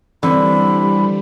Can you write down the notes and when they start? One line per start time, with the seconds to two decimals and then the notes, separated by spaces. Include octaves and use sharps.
0.23 D3 E3 G3 C4 B5